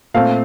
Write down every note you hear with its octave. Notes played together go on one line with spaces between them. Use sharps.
A#2 A3 C4 F5